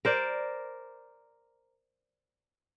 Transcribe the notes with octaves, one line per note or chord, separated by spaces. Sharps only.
A#4 C5 D5